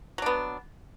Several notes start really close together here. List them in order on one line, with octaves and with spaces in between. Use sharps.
F#3 D4 B3